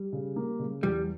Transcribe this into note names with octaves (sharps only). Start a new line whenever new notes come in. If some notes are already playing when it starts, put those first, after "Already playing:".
Already playing: G3
C#3
A#3
C#3
E2 G3